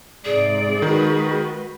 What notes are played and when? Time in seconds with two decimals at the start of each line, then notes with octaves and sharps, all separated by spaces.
0.25 G#2 C3 G#4 D5
0.82 D#3 G#3 F#4 B4